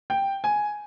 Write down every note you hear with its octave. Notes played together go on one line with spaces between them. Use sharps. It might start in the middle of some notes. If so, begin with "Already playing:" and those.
G5
G#5